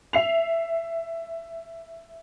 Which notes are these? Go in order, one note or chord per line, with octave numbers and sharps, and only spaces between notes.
E5 C7 F7